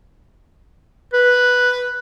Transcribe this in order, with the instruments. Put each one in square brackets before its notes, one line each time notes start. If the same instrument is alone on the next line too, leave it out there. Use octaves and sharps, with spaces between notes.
[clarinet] B4